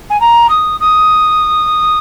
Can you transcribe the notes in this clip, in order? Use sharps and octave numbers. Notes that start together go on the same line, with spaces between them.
G#5
A#5
D#6
D#6